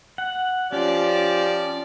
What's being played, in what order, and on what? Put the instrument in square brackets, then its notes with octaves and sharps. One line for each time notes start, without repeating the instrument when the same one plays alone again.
[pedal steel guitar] F#5
[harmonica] F3 G4 D5 [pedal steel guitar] C#4